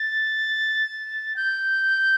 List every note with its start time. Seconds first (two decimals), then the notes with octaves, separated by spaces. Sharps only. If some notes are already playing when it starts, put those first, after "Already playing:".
Already playing: A6
1.36 G6